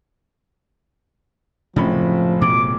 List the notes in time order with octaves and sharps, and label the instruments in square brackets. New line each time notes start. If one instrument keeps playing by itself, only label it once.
[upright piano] F#1 A2 B5 [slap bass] C3 C#4 [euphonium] F3
[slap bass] B2 [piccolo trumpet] D6